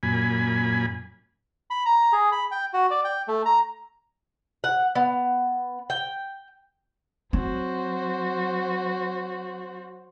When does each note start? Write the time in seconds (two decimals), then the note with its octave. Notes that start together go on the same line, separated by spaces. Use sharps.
0.03 F#2 A#2 G#5 B5
1.71 B5
1.86 A#5
2.13 G#4
2.32 B5
2.51 G5
2.73 F#4
2.91 D5
3.04 G5
3.28 A3
3.46 A#5
4.64 F#5
4.95 B3
5.90 G5
7.33 F#3 C4 F#4 C5